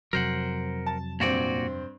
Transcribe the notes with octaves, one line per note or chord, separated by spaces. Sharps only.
F2 C3 F#3 A#4 C5 F#5
A5
G2 A#2 C4 F#4 D5